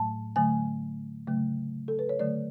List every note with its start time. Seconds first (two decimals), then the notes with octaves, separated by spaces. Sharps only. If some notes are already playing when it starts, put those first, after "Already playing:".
Already playing: A2 F#3 A3 A5
0.36 D3 F#3 A3 G#5
1.27 C#3 F#3 A3
1.88 A4
1.99 B4
2.09 C#5
2.19 D3 F#3 A3 D5